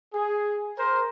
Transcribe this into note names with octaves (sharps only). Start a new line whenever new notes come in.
G#4
A#4 C5